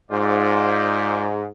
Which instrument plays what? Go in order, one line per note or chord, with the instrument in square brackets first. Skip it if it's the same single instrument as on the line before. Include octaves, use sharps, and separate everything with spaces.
[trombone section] G#2 [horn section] F4 C5 D5